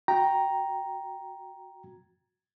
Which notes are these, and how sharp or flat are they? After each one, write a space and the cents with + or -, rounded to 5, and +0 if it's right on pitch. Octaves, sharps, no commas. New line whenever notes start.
F#4 -20 G5 +0 A#5 +5